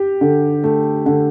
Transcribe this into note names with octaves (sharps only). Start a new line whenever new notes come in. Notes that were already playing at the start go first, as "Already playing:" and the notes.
Already playing: G4
D3
A3
D3